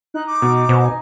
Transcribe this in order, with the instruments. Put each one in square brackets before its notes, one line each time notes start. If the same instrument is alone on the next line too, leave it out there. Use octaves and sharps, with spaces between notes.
[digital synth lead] D#4 [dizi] F#6
[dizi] D6
[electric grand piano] B2
[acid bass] B2 [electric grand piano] C5
[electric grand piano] G#5